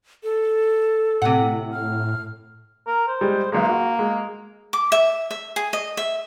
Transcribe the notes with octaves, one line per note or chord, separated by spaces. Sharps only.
A4
A2 C3 F#5
F6
A#4
C5
G3 G#3
B1 G#3 A#3
F#4
G#3
D6
E5
E5
G#4
D#5
E5